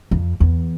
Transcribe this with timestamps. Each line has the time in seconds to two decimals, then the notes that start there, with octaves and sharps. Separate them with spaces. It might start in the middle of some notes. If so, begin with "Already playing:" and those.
0.11 F2
0.40 E2